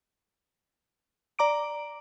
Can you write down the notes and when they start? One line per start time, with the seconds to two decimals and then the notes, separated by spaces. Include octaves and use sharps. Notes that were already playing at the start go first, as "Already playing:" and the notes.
1.39 D5 A#5 D6 D7